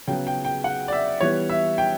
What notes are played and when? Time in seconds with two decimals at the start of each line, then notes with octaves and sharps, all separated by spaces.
0.08 C#3 F#3 B3 G5
0.27 G5
0.45 G5
0.64 F#5
0.88 D5
0.93 E5
1.21 E3 G3 B3 C#5
1.50 E5
1.78 G5